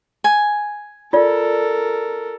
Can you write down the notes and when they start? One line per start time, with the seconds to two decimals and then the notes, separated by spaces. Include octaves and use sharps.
0.24 G#5
1.13 F4 A4 A#4 D5